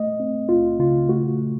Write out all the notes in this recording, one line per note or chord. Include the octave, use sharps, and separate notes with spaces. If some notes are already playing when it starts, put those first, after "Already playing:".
Already playing: A3 D#5
C4
C#2 F4
C#3 F4
A3 F#4